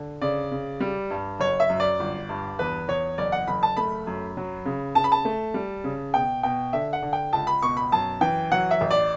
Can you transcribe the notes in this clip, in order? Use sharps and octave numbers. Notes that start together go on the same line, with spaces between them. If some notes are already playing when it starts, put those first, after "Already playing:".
Already playing: D3
C#3 D5
C#3
G3
G2
F#1 C#5
E5
F#2
D5
G1
G2
E2 B4
E2 C#5
F#1 D5
F#5
F#1 B5
A5
A3 B5
F#2
F#3
C#3
C#3 A5
B5
A5
A3
G3
C#3
B2 G5
B2 G5
D3 E5
F#5
D3
G5
C#2 A5
B5
B2 C#6
B5
F#2 A5
E3 G5
F#3 F#5
E5
A1
D5